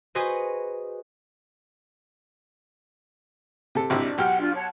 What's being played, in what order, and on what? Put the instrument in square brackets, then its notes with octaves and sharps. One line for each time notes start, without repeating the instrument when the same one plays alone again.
[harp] F#4 G#4 B4 C5 D#5
[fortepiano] C3 A4
[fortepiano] G#1 C3 E4 [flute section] D4
[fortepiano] B1 G4 F6 [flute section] F#5
[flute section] D4 F4
C#5 F#5 A5